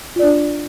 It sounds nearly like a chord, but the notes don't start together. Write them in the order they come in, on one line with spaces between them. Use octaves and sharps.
F4 D5 D4